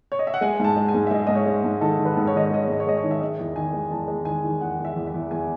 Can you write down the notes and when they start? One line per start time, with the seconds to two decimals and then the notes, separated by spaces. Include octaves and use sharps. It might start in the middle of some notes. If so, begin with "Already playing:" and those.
0.12 C#5
0.19 D#5
0.27 E5
0.34 F#5
0.41 G#3 G#5
0.60 G#2 A5
0.76 G#3
0.89 G#5
0.95 G#2
1.07 E5
1.11 G#3 D#5
1.27 G#2 D#5
1.35 C#5
1.46 G#3
1.64 G#2
1.81 D#3 A4
1.99 D#3
2.05 B4
2.17 G#2
2.27 C#5
2.34 D#3 D#5
2.45 C#5
2.51 G#3 D#5
2.63 C#5
2.68 G#2 D#5
2.80 C#5
2.87 G#3 D#5
2.97 C#5
3.04 D#3
3.11 E5
3.21 G#3 D#5
3.39 E2
3.56 D#3 G#5
3.73 G#3
3.91 E2 A5
4.08 G#3
4.25 D#3 G#5
4.44 D#3
4.61 E2 F#5
4.79 E2
4.85 E5
4.96 E2
5.07 E5
5.14 E2
5.31 E2 G#5